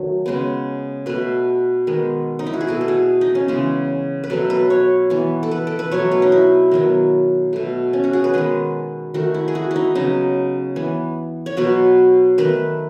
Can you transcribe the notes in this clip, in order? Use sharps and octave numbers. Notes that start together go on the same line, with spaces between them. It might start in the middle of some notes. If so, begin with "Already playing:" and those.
Already playing: D#3 F#3 A3
C#3 G#3 B3
B2 A3 B4
D#3 G#3 B3
D#4
E4
F#4
G#4
B2 A3 A4
A4
G#4
D#4
C#4
C#3 E3 G#3 B3
B4
B2 F#3 A3 A4
B4
C#5
E3 B3
A4
B4
A4
B4
B2 F#3 A3 C#5
B4
D#4
E4
D#3 F#3 B3
B2 A3
C#4
F#4
G#4
B4
D#3 G#3 B3 G#4
D#3 A3 F#4
E4
G#4
F#4
D#4 E4
C#3 F#3 B3 D#4
E3 B3
C#5
B2 F#3 B3 B4
D#3 A3 B4